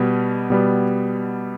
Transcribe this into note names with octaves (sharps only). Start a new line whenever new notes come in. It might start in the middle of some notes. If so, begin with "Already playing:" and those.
Already playing: B2 G3 B3
B2 G3 B3